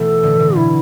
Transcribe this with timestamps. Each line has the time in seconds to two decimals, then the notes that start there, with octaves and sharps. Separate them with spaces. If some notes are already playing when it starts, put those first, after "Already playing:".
Already playing: B2 E3 A3 B3 A4
0.23 A2 D3
0.39 A2 D3
0.56 B2 E4